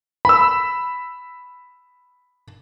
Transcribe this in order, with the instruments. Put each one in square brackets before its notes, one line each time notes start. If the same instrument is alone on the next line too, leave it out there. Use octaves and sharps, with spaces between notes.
[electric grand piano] B5 E6